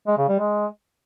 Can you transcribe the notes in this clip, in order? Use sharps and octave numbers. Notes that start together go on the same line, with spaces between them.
G#3
C#3
G3
G#3